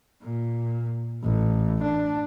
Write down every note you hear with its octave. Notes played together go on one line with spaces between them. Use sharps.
A#2
A1
D4